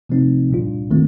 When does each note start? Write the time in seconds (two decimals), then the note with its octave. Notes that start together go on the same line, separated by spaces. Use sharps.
0.09 C3 F3 A3 C4 D#4
0.50 A#2 G3 D4 F4
0.91 D#3 A3 C4